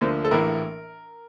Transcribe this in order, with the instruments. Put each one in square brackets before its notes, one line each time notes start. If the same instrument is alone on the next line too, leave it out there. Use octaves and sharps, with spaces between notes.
[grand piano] D2 D3 F3 A#3 C5
A4
A#1 A2 E3 A#3 E4 A#4